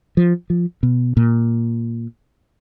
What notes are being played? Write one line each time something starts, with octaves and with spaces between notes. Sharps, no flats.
F3
F3
B2
A#2